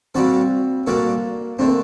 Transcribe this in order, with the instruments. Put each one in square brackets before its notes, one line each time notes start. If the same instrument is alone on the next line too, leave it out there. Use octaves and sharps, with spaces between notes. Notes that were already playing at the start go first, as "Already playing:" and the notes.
[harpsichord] A#2 G3 D4 F#4 A4 [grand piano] C4
[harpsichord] A#2 G3 D4 F#4 A4 [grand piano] A#3
[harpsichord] D3 A3 D4 [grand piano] C4
[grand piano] A#3